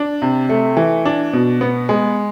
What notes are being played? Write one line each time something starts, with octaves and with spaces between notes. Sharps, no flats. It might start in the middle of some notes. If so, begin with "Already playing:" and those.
Already playing: D4
C3
A3
E3
D4
B2
B3
G#3